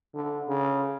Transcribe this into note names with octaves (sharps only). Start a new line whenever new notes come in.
D3
C#3